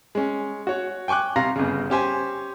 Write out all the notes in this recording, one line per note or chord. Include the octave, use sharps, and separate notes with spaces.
G#3 C#4
F#4 C#5
G5 G#5 C#6 D6 F#6
C3 F5 A#5 C6 A#6 C7
G1 C#3
C#4 G4 C5 G#5